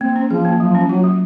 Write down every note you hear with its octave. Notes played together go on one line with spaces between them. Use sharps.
A#3 C4
C#4
F3 G#4
A#3
F3 F#3
C#4
F#3 F4
F#3